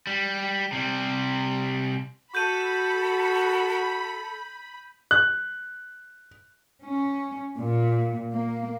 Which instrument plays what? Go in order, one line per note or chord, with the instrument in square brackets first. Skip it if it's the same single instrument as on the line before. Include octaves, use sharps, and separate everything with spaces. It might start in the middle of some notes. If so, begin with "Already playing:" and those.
[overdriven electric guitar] G3
C3 G3
[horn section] F#4 [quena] A4 [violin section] B5 [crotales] G6 D#7
[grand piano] F#6
[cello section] C#4
A#2
A#3